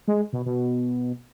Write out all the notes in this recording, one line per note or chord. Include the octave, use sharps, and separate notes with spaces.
G#3
B2
B2